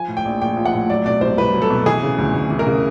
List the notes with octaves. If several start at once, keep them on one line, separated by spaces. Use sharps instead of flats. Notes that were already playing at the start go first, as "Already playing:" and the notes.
Already playing: F3 G#5
A2
G5
A#1
A#1 G5
F3
F#5
A2
F#3 D5
B2 D5
C2 C5
C2 B4
F#3
A4
B2
E3 G#4
C#3
D2
D2
E3
A#4
C#3